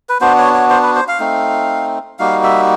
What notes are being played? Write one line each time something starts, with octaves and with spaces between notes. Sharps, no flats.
B4
B3 D4 F#4 C5
C#5
C#5
C5
B4
C5
F5
A3 C4 D#4
G3 A#3 D#4 F#4 F5
E5